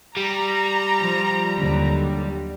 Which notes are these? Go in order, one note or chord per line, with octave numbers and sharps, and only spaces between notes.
G3 A#5
F3
D#2 D3 F#3